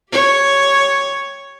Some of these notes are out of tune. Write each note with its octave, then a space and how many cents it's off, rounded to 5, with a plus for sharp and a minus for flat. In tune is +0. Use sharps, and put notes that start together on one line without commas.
G4 +0 C#5 +0